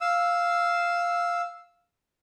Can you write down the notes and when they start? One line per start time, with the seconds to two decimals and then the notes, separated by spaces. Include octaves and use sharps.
0.01 F5 E6